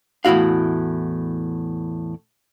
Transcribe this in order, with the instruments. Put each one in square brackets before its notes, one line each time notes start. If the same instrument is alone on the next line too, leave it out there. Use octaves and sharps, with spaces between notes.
[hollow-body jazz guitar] E2 A2 E4 F#4 F5